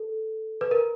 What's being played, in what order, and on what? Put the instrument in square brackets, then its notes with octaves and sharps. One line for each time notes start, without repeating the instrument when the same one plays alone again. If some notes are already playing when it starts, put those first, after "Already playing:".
Already playing: [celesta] A4
B4
A#4